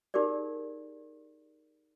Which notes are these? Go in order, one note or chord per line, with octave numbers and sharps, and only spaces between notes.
D#4 G4 G#4 A#4 D5